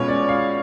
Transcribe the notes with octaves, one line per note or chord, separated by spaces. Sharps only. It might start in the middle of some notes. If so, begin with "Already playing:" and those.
Already playing: B2 G#3 C#4 F4 C#5
D5
F5